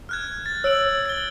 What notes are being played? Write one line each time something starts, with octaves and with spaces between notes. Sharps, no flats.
F6 F#6 G#6
A6
C#5 E6 D7 F#7
F#7
A6 G7